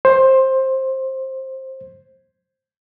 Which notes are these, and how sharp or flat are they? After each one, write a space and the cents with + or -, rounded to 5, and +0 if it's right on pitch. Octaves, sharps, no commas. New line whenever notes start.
C5 +15